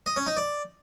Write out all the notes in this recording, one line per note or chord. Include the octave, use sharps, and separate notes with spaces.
D#5
C#4
D#4
D5